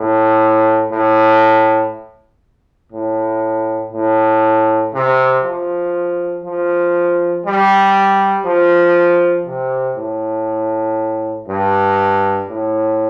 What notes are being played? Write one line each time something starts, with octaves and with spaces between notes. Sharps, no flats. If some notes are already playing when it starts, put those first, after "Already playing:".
Already playing: A2
A2
A2
A2
C3
F3
F3
G3
F3
C3
A2
G2
A2